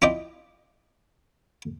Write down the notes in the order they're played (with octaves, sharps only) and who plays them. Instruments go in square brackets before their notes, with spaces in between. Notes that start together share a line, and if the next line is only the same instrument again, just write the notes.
[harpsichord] E4 F4 D5 D#5 G5